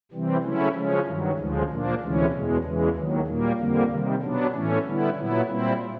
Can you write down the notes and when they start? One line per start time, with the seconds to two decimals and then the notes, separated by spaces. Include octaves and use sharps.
0.12 C3 E3 G3 C4
0.43 C#3 F#3 A3 C#4 E4
0.75 C#3 F3 G#3 C#4
1.06 G2 D#3 F#3
1.38 D2 C#3 F3 G#3
1.69 A#2 F3 A#3 D4
2.01 D2 C3 E3 G#3 C#4
2.32 E2 B2 G#3
2.64 E2 C#3 E3 G#3
2.95 D#2 D#3 F#3
3.27 A#2 G3 A#3
3.58 F2 D3 G3 A#3
3.90 C3 D#3 G3
4.22 B2 F#3 B3 D4
4.53 A2 E3 A3 C#4
4.84 D3 G3 B3 E4
5.16 A#2 F#3 B3 E4
5.48 A#2 G3 C4 E4